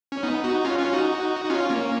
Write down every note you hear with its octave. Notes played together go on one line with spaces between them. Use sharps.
C#4
B3 D#4
D#4 F#4
C#4 F4
C#4 F4
D#4 F#4
F#4
C#4 F4
A#3 C#4